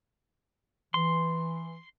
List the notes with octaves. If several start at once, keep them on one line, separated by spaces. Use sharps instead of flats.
E3 C6